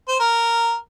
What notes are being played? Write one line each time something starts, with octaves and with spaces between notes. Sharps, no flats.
C5
A#4